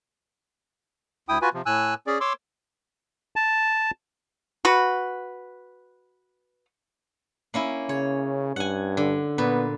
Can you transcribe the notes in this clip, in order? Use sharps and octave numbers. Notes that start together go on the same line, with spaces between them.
D2 E4 G5 D#6
F4 F#4 B4 G#5
C3 F3
A2 G#5 E6 F#6
C#4 G#4 D5
C#5 C6 D6 E6
A5
F#4 B4
A#3 C#4 E4
C#3 C#5
G2 F#5 G#5
D3
A#2 B3 B4